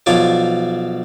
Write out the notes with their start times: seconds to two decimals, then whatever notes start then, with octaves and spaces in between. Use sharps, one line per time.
0.06 B1 F3 F4 C#5 D5